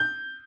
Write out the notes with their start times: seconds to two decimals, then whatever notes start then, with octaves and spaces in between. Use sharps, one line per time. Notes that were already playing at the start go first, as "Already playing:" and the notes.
Already playing: G6